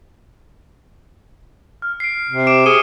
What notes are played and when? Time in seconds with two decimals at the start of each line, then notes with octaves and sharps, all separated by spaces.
1.82 F6
2.00 C7 D7
2.29 C3
2.47 D6 D7 E7
2.66 G#4 C#7 D#7 G7